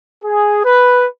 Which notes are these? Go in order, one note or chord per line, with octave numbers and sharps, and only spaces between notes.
G#4
B4